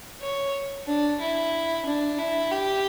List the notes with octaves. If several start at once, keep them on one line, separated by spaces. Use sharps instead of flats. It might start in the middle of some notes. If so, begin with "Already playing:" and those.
C#5
D4
E4
D4
E4
G4